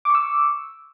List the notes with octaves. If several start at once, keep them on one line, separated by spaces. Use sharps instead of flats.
C#6 D6 E6